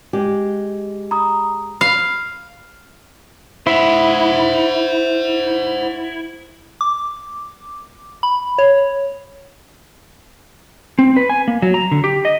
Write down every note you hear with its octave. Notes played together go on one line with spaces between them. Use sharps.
G#3 G4
A#5 B5 D#6
F5 B5
E4 C5 F#5
D6
B5
C#5
C4
B4
G#5
A#3
F#3
A#5
D3
G4
D#5